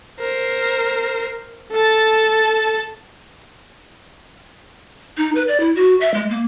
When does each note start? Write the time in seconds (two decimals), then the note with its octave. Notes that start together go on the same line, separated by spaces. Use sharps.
0.20 A#4 C5
1.71 A4 A5
5.17 D#4
5.35 B4
5.48 D5
5.60 E4
5.76 F#4
6.01 E5
6.14 G#3
6.30 A#3